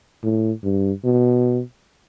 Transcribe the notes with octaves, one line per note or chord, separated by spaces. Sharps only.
A2
G2
B2